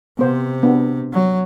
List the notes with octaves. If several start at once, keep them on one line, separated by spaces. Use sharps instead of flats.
C3 B3 C5
B3 D4
F#3